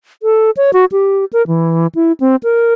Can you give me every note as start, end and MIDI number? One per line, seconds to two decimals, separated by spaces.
0.23 0.51 69
0.57 0.71 73
0.73 0.85 66
0.92 1.25 67
1.33 1.46 70
1.47 1.87 52
1.95 2.12 64
2.20 2.36 60
2.43 2.74 70